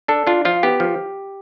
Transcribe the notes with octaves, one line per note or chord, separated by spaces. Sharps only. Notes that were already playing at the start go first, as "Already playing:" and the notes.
D4 A4
D4 F4
F3 F4
B3 G4
F3